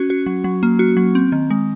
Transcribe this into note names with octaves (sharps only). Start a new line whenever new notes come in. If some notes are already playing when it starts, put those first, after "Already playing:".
Already playing: C#4 F#4
F#4
F#3
F#3
A#3
F#4
F#3
C4
D#3
G#3